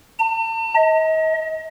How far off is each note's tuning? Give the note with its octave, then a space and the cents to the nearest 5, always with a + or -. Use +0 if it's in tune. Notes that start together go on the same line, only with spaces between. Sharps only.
A5 +40
D#5 +35